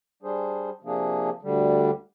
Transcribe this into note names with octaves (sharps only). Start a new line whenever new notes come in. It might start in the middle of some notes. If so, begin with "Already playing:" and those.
G3 D4 G#4 C5
C3 F3 A#3 D4 G#4
D2 D3 G3